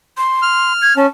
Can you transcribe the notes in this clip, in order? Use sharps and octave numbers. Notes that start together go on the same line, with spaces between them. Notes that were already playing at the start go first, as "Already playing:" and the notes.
C6
F6
G#6
C#4 A5